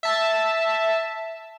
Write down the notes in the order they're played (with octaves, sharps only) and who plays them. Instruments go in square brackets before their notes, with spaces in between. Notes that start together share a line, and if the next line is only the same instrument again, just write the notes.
[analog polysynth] E5 A5